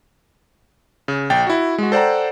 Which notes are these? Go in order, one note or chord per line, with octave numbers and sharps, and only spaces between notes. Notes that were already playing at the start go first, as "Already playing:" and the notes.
C#3
A#1 G5 A6
E4 F#4
G#3 F#4
A4 C5 D5 F#5 G5 A#5